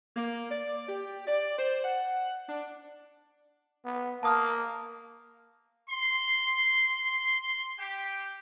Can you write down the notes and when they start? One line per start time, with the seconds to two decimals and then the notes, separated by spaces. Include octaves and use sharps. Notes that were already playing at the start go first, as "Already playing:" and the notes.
0.16 A#3
0.51 D5
0.89 G4
1.27 D5
1.59 C5
1.84 F#5
2.49 D4
3.85 B3
4.23 A#3 A5 D#6 F6
5.89 C6
7.79 G4